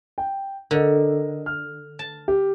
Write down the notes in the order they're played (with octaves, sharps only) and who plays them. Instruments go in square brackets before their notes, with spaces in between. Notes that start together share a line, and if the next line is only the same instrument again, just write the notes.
[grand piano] G5
[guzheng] D3 [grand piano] A#4 D#5
[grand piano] F6
[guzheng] A5
[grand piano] G4